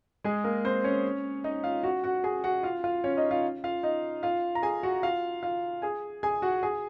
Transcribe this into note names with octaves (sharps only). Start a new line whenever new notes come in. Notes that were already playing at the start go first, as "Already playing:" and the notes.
G#3 G#4
A#3 A#4
C4 C5
C#4 C#5
D#4 D#5
F4 F5
F#4 F#5
F#4 F#5
G#4 G#5
F#4 F#5
F4 F5
F4 F5
C#4 C#5
D#4 D#5
F4 F5
F4 F5
D#4 D#5
F4 F5
A#5
G#4 G#5
F#4 F#5
F4 F5
F4 F5
G#4 G#5
G#4 G#5
F#4 F#5
G#4 G#5